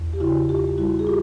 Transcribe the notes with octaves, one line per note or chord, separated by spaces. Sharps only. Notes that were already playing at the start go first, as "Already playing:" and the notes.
Already playing: E2
G4
C#3 E4 F#4
E2 F4 G4
G3 E4 F#4
G#4
F4 G4